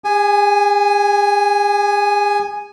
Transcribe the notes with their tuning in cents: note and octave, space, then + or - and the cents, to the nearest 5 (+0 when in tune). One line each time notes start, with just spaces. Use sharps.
G#4 -45 G#5 +0